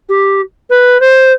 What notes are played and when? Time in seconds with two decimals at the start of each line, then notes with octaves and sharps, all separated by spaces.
0.09 G4
0.70 B4
1.00 C5